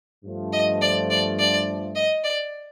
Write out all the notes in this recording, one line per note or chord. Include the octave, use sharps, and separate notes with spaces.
G2 F3 A3
D#5
D5
D5
D5
D#5
D5